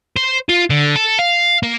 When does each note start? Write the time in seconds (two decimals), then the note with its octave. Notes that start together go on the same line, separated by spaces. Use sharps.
0.16 C5
0.49 F4
0.70 D3
0.96 A4
1.19 F5
1.63 A#3